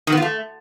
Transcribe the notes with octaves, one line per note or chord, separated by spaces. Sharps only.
D#3
B3
F4
A3